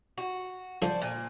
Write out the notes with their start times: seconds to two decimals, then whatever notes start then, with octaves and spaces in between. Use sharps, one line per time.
0.18 F#4
0.82 D3 F3 G#4 A4 C5 D5
1.02 A#2